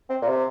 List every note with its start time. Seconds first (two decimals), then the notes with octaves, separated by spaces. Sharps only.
0.10 C4
0.22 A#2
0.28 C3